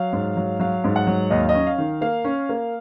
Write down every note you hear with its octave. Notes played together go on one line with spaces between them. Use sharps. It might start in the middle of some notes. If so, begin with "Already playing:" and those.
Already playing: F#3 F5
G#2
F#3
F#3 F5
G#2
F#5
F#3
D#2 D#5
F5
D#5
C#4
F5
D#3
A#3 F5
C#4
A#3